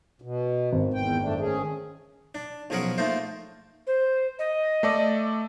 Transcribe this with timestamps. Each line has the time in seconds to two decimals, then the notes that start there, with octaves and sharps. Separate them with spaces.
0.22 B2
0.72 G#1
0.94 E2 G5
1.22 F#2 A3 D4
1.40 C#4 G#4
2.35 D4
2.70 B1 F3 C#4 G#4 A#4 F#5
2.98 A3 A#3 D#4 F4 C5
3.87 C5
4.39 D#5
4.83 A3 A4 D5